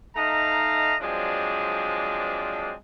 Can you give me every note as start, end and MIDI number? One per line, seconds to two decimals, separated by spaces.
0.17 0.95 57
0.17 0.95 63
0.17 0.95 75
0.17 0.95 77
0.17 0.95 82
1.01 2.73 53
1.01 2.73 54
1.01 2.73 56
1.01 2.73 60
1.01 2.73 62